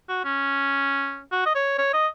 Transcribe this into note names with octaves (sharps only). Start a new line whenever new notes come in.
F#4
C#4
F#4
D#5
C#5
C#5
D#5